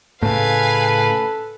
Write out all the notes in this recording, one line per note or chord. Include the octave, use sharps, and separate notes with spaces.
A2 C#3 A4 B4 F5 G#5